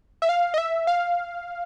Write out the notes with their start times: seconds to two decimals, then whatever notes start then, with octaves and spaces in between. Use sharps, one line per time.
0.22 E5
0.29 F5
0.54 D#5
0.58 E5
0.87 F5